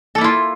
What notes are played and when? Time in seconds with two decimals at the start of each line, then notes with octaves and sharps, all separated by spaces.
0.15 A4
0.18 A#3
0.21 E4
0.24 F4